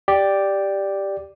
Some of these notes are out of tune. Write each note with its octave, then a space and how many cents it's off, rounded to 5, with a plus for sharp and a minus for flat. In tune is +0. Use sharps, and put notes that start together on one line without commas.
G4 +0 D5 +0